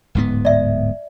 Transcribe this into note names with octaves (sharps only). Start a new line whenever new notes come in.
D1 G#2 B3
D5 E5